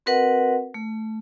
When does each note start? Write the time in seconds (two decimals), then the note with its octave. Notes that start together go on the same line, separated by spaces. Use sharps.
0.06 C4 F#4 A#4 B4 D#5 F#5
0.74 A3